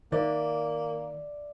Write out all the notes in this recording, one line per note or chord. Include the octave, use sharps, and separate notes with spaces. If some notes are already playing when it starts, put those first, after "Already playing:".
D#3 A#3 D5 E5